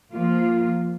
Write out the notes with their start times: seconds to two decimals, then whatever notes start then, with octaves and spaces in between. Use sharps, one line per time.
0.11 F3 A#3 F4